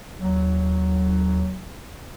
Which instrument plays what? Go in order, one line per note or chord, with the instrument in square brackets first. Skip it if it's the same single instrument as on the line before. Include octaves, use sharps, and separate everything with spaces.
[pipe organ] D#2 [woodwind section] F#3